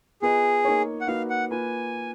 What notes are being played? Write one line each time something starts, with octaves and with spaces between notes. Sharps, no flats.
B3 F4 G#4 B4 D#5
A#3 D#4 A#4 C#5
F#5
A#3 D#4 F#4 B4 F5
F#5
A#3 F4 B4 G#5